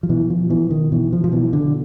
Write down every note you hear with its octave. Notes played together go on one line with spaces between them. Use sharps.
F3
B2 E3
F3
B2 E3
D#3
B2 E3
F3
F3
B2 E3
D3